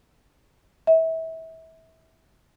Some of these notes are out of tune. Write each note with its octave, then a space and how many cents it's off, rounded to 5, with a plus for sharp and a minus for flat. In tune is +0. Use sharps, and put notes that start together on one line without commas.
E5 -30